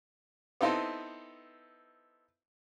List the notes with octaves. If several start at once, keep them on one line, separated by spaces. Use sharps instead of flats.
B3 C4 D#4 E4 A4 C5